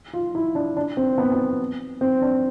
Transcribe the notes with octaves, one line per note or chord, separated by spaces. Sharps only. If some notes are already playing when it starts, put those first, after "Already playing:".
F4
E4
D4
D4
C4
B3
B3
C4
D4